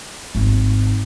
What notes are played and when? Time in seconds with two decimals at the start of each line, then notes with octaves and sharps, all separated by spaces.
0.35 G#1